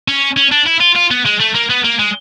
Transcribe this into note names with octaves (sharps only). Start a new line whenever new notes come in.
C#4
C#4
D4
E4
F4
F4
B3
G#3
A3
A#3
B3
A#3
G#3